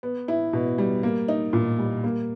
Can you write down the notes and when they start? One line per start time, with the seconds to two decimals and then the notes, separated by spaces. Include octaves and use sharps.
0.03 B3
0.28 E4
0.53 B2
0.78 G3
1.03 A#3
1.28 D#4
1.53 A#2
1.79 G3
2.04 A#3